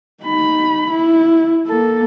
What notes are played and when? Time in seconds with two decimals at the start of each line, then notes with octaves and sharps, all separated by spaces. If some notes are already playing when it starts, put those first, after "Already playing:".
0.24 D#4 B5
0.90 E4
1.68 A#3 A4